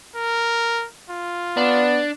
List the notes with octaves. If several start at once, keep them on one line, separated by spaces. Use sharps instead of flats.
A#4
F4
B3 D4